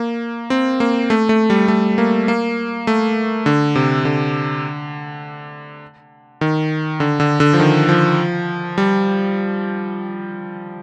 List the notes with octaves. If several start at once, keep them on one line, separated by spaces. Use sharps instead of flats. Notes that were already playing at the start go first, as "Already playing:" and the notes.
Already playing: A#3
C4
A#3
A3
A3
G3
A3
A#3
A#3
A3
D3
C3
D3
D#3
D3
D3
D3
F3
D#3
F3
G3